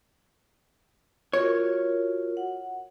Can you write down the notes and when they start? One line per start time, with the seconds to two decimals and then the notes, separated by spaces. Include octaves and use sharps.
1.33 F4 F#4 A#4 C#5
2.37 F#5